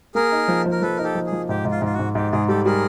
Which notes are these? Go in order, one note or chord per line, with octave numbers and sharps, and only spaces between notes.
A#3 G#4 A#4
D#4
F3
F3
A#4
F3 A4 B4
D#4 A#4
G4 A4
F3
G#4
F3
G#2 G4
G#2
F4
G#2 F4
F#4
G#2
G#2 G4
G#2 G#4
G3 G4 A4
G3 G#4 A#4